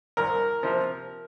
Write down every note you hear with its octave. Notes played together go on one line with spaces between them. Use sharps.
C2 A#4
C3 F3